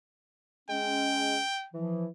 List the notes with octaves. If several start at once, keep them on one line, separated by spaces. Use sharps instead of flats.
G#3 C#4 G5
E3 F3